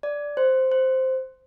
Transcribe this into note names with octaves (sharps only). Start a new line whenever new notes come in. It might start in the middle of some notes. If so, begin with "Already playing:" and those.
D5
C5
C5